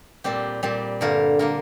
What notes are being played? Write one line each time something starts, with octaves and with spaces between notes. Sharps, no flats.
A#2 G3 C4 G4
A#2 G3 C4
G2 D3 A#3 A#4
D3 A#3 A#4